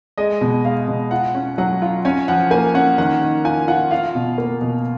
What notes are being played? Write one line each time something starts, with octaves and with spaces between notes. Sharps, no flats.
G#3 D#5
B2
G#3 F5
B2
F4 F#5
C#4
F#3 F#5
F4
C#4 G#5
F3 F#5
A#3 G#5
C#4 F#5
D#3 F#5
D#3
F4 G#5
F4 F#5
F4 F5
B2
A#3
B2